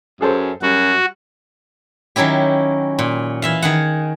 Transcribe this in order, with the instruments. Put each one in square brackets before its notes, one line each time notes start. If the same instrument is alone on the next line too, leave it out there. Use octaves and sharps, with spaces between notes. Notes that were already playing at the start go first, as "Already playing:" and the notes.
[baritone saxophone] F#2 [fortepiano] G#4 A4 C5
[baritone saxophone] F#2 [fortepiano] G3 [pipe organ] F#4
[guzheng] D#3 F#3 C#4 E4 G4
A#2
E3 E5 F5
D#3 G#4 F#5